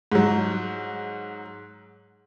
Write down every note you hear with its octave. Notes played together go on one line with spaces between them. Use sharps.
G#2 F#3